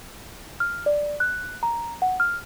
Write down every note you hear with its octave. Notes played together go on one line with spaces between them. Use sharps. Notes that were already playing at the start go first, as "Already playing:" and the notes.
F6
D5
F#6
A#5
F#5
F6